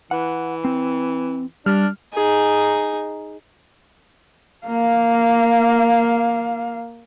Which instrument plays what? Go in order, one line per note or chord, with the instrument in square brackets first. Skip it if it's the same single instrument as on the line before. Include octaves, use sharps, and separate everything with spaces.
[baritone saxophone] E3 [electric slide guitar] F#5
[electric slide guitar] C4
[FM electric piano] G3 F6 [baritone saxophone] D4
[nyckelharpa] D#4 G#4
[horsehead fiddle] A#3 F5